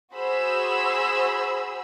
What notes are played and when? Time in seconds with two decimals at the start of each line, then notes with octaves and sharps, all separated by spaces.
0.14 F#4 G#4 C5 B5 E6